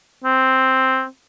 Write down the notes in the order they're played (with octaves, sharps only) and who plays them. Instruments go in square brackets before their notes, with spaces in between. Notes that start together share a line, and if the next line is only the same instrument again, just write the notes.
[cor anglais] C4